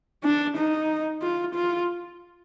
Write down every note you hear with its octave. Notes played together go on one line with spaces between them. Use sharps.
D4
D#4
F4
F4